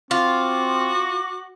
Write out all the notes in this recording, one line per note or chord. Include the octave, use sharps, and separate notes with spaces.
C4 F4 F#4 D6